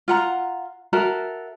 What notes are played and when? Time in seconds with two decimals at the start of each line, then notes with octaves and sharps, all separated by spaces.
0.08 F4 F#5 A#5
0.93 F#4 A4 A#4 E5